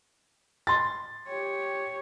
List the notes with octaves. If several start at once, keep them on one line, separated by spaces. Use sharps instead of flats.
C6 A6
G4 C#5